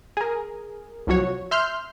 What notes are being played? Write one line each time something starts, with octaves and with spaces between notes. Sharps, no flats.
G#4 A#4
C2 C3 F3 F#3 F#4 C#5
E5 C6 F6 G6